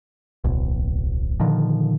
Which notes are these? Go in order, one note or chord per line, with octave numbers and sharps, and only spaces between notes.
D1 B1
A#2 D3 D#3 F3